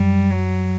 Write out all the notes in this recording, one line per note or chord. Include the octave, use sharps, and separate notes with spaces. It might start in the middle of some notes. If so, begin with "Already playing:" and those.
Already playing: F#2 G3
F#3